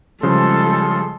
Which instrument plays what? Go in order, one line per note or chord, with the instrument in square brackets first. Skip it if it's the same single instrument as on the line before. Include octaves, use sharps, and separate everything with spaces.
[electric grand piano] C#3 F3 G3 [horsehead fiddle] G#3 A4 [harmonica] C6